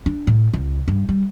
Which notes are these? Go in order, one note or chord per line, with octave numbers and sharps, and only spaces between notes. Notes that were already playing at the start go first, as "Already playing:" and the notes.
D4
A2
C#2
G2
G3